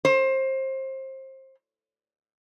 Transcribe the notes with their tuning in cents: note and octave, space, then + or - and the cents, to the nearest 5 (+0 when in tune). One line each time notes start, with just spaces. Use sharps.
C5 +25